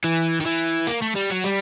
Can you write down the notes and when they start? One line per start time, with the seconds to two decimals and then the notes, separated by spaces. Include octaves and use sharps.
0.04 E3
0.41 D#3
0.46 E3
0.87 A#3
1.02 A3
1.16 G3
1.30 F#3
1.45 G3